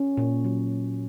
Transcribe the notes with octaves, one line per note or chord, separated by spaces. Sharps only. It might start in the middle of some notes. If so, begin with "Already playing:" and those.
Already playing: C#4
A#2
F#3